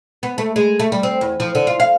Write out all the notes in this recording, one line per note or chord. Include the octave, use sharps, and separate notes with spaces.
B3
A3
G#3
A3
G3
C4
E2
F3
D3
F4
F5